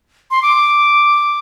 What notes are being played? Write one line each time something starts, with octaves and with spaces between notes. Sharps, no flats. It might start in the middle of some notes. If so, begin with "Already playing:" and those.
C6
D6